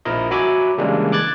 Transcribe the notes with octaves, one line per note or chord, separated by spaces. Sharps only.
A#1 F3 E4 A#4 D#5
F#3 F#4 E5 G#5 B5 D6
C#3 E3 G3 G#3 A#3 D4
D6 F#6 G#6 A6